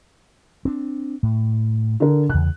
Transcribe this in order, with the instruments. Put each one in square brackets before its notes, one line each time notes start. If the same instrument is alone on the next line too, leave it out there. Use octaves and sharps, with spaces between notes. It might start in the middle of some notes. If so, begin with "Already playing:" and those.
[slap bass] C4 D4
A2
[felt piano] D3 A#4
[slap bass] E2 C#3 [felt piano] F#6